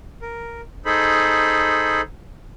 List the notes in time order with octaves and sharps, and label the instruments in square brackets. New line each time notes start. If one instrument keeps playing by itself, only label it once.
[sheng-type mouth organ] A#4
D#4 G#4 A4 C5 B5